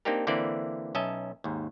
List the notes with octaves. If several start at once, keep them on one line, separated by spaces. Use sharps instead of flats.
A#3 C4 D4 D#4 G4 A#4
D3 E3 A#3 C4 E4 D5
B1 C#4 D#5 E5 A5
D#2 G#2